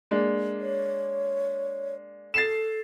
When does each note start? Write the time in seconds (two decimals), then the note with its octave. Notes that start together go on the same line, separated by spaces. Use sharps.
0.11 G#3 A#3 D4
0.60 C#5
2.34 A4 A6 C7 E7